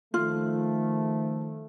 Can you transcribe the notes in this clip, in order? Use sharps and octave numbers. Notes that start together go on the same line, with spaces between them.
D#3 F3 A3 F4